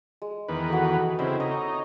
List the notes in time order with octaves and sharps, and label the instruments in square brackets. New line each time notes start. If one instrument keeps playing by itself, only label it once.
[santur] G#3
[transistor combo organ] E2 D#3 B4
[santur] F#4 A4
[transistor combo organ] C#3 C4 E4 [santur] D#5
[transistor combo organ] D#4 [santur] C#5